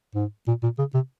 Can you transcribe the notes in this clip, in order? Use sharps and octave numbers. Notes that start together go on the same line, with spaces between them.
G#2
A#2
A#2
C#3
C3